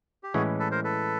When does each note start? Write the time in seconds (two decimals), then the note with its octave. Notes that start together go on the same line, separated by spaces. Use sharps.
0.23 G4
0.34 A2 E3 G#3 C#4 E4 F#4 G#4
0.59 A4 B4
0.71 A#4 C5
0.84 A4 B4